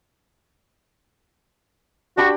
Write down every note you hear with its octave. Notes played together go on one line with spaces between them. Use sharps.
D4 F#4 G4 B5